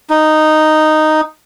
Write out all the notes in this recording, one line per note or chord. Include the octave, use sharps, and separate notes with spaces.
D#4